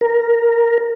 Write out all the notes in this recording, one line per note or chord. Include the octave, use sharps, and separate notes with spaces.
A#4